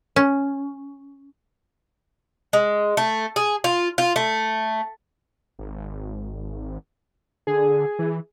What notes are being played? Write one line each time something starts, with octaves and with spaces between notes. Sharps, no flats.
C#4
G#3
A3
G#4
F4
F4
A3
G#1
D3 G#4
E3